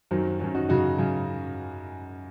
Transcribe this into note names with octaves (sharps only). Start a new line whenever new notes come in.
F#2 D#3 F#3 C4
F#2 D#3 F#3 C#4
D#4 F#4
F#2 C#3 F#3 D#4 F#4
F#2 C#3 F#3